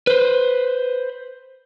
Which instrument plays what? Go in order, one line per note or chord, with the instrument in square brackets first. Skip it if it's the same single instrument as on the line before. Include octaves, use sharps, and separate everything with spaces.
[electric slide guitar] B4 C5